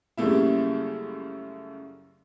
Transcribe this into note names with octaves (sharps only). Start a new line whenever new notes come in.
F#2 C#3 G3 A3 A#3 E4